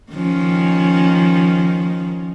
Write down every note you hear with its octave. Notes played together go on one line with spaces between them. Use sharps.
D#3 F3 C#4